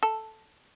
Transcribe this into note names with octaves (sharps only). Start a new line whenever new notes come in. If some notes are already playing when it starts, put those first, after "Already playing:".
A4